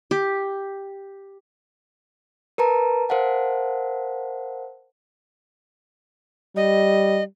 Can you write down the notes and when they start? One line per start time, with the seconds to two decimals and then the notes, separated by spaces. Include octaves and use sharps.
0.11 G4
2.58 A#4 B4 A5 A#5
3.09 A#4 C5 F5 F#5 A5
6.56 G3 D#5